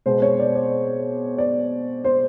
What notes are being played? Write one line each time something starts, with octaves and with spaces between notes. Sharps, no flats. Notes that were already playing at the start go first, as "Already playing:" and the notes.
B2 G#3 B3 C5
C#5
D5
D5
D5
C5